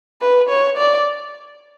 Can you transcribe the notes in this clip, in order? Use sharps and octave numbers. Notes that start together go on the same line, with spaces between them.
B4
C#5
D5